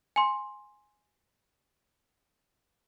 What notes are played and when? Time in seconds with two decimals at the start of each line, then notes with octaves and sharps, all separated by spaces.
0.16 G#5 C6